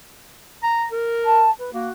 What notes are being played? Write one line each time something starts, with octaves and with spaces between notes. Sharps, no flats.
A#5
A#4
A5
B4
A#3 F#4